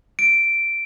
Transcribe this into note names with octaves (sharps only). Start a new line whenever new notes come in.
D7